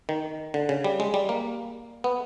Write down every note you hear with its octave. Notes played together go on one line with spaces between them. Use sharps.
D#3
D3
C#3
G3
G#3
G3
A#3
B3